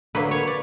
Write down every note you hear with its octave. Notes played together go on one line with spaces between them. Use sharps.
D3 F#3 A#3 B4
C#5
D5